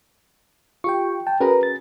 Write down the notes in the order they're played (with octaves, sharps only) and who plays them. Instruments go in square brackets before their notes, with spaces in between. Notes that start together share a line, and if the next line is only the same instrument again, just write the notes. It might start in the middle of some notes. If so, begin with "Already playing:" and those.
[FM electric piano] F4 G4 G5 [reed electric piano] C#6
[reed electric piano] G5 [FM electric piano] A5
[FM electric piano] C#4 F#4 G#4 [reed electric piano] A#4 B4 A#5
[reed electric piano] A6